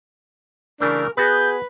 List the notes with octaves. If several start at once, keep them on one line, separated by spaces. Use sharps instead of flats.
C#3 E3 A3 D4 A#4
B3 F#4 G#4 B4 G6